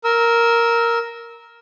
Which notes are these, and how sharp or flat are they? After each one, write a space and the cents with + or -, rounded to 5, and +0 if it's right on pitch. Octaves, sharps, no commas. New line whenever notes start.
A#4 +0 E6 -20